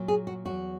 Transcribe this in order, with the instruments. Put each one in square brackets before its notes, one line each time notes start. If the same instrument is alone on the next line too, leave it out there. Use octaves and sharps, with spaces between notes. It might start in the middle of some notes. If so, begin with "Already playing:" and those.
Already playing: [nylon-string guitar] A#2 F#3
G#4
F#4
E2 D#3 F#3 F#4